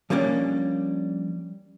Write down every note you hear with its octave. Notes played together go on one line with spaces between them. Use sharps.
F3 G3 A#3 C#4 D4